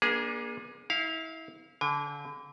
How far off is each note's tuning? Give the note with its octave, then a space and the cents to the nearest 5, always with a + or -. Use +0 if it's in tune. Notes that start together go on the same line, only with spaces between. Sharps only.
A#3 +35 D4 +0 G#4 +0
E4 -30 F5 +0
D3 -30 G#5 -45